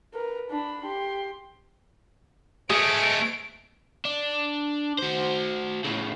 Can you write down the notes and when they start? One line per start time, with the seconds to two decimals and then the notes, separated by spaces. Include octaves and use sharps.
0.14 A#4 B4
0.51 D4 B5
0.85 G4 C6
2.70 G#3 A3 G#4 D7
4.05 D4
4.99 F#4 C5
5.84 A2 C#3